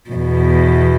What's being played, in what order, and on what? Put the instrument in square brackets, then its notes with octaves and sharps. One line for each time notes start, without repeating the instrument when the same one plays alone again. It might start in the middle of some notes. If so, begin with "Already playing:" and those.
[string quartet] E2 B2